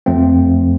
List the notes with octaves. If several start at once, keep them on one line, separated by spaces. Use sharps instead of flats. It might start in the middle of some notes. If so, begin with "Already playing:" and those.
F2 F3 A3 C4